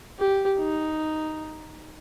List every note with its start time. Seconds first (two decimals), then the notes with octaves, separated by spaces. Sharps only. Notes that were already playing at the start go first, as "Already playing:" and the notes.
0.19 G4
0.59 D#4